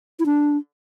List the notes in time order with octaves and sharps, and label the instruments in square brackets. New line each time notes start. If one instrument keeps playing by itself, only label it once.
[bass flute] E4
D4